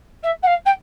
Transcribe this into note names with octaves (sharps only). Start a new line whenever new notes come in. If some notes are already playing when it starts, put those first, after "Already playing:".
E5
F#5
F5
G5